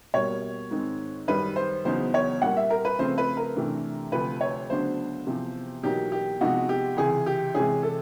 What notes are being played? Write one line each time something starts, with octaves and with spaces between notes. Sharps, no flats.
B2 G3 A#3 C#5
G#2 D#3 G#3 C4
F#2 D#3 G3 B4
C5
E2 C#3 F#3 B3 D#4 C5
C#5
A#2 G3 A#3 F#5
E5
A#4
B4
C#3 F3 A3 C4 C5
B4
A#4
C3 E3 A3 D4
D2 C3 F3 B4
C#5
D2 C#3 F#3 B3 D4 C5
E2 C3 F3
E2 B2 F#3 A#3 D#4 G4
G4
C3 F3 G#3 B3 D#4 F#4
G4
C#2 C3 E3 G#4
G4
C3 E3 G#3 C#4 G#4
A4